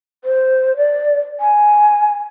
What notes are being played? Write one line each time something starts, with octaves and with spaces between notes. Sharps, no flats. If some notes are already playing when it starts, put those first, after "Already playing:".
C5
D5
G#5